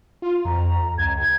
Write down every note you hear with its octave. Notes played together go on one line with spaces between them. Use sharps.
F4
F2 A#5
C#2 G#6